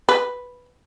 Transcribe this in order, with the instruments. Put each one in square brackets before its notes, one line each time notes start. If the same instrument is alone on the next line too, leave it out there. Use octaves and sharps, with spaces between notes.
[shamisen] B4